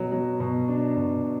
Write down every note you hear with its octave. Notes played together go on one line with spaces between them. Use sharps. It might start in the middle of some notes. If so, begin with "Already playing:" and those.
Already playing: B2 F#3
F#3
B2
D4
B2